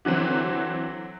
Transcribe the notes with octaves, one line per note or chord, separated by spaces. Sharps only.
D3 E3 F#3 C4